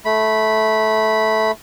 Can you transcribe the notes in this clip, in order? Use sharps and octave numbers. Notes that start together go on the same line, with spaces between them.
A3 B5